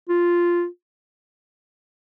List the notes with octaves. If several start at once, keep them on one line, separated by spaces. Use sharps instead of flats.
F4